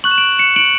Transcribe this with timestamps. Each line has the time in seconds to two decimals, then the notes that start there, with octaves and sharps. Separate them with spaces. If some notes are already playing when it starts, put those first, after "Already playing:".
0.04 C#6 F#6 F#7
0.11 E7
0.18 D7 F#7
0.38 C#7 E7
0.56 D7 F#7